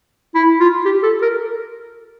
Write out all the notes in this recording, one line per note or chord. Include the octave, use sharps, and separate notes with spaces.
E4
F4
G4
A4
A#4